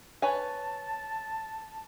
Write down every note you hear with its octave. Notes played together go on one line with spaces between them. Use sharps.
B4 C#5 G#5 A5